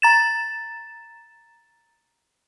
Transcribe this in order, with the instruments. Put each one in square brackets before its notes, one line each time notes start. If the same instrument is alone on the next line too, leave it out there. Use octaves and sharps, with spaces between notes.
[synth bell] A#5 A6 E7